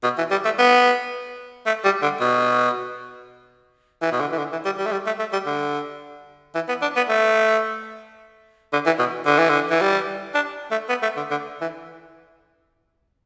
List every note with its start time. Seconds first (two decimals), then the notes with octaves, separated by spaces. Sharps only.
0.04 B2
0.18 E3
0.31 G3
0.45 A3
0.59 B3
1.66 A3
1.85 G3
2.03 D3
2.21 B2
4.02 E3
4.12 B2
4.21 D3
4.32 E3
4.38 D3
4.52 E3
4.65 G3
4.78 G3
4.86 A3
4.92 G3
5.07 A3
5.19 A3
5.33 G3
5.46 D3
6.55 E3
6.69 B3
6.82 D4
6.97 B3
7.09 A3
8.73 D3
8.86 E3
8.99 B2
9.27 D3
9.39 E3
9.50 D3
9.70 E3
9.82 G3
10.35 D4
10.71 A3
10.89 B3
11.03 A3
11.17 D3
11.31 D3
11.62 E3